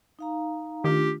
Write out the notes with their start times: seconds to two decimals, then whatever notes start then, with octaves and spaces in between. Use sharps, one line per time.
0.19 D#4 F5 A#5
0.84 D#3 A3 D4 F4 G4